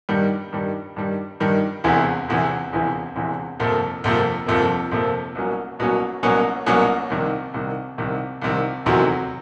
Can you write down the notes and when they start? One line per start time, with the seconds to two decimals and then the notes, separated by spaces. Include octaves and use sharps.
0.09 G2 D#3 G3
0.53 G2 D#3 G3
0.96 G2 D#3 G3
1.40 G2 D#3 G3
1.84 E1 E2 C3 E3
2.28 E1 E2 C3 E3
2.72 E1 E2 C3 E3
3.15 E1 E2 C3 E3
3.60 G1 F2 C3 F3 A#3
4.04 G1 F2 C3 F3 A#3
4.47 G1 F2 C3 F3 A#3
4.91 G1 F2 C3 F3 A#3
5.35 C2 B2 F#3 A#3 C#4
5.79 C2 B2 F#3 A#3 C#4
6.23 C2 B2 F#3 A#3 C#4
6.66 C2 B2 F#3 A#3 C#4
7.10 C2 C3 D#3
7.54 C2 C3 D#3
7.98 C2 C3 D#3
8.42 C2 C3 D#3
8.85 F1 E2 C3 D#3 F#3